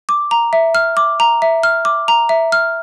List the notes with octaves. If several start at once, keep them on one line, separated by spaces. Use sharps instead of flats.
D6
A#5
E5
F6
D6
A#5
E5
F6
D6
A#5
E5
F6